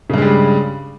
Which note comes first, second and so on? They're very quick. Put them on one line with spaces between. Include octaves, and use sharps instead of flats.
C#3 G2 G#3 G3